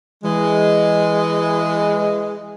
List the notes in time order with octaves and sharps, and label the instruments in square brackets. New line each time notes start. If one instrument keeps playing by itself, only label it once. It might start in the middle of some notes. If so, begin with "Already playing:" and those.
[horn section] E3 G#3